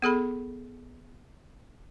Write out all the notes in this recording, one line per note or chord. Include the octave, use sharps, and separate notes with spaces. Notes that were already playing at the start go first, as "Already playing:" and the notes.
B3 G#4 A4 B5